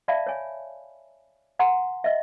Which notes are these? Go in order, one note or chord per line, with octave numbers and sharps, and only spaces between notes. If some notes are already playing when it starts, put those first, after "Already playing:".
D5 E5 F5 A5 B5
C#5 G#5
F#5 G#5 A#5 C6
D#5 E5